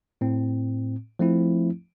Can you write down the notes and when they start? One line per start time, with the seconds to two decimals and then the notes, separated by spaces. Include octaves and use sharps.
0.21 A2 C4
1.19 F3 A3 C4 E4